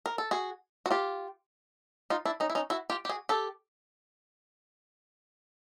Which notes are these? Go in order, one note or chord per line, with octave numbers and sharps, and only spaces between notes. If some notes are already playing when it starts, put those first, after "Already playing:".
A#4
A4
F#4 G#4
F#4
F4 G4
D#4 F4
D4 E4
C#4 D#4
E4
C#4 D#4
E4 F#4
F4 G4
G4
F#4 G#4
G4 A4